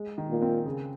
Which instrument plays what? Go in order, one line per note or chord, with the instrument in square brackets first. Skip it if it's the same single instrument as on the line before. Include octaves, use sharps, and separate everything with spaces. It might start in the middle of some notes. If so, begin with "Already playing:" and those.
Already playing: [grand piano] G#3
D#3
[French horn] A#2
[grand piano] C4
C#3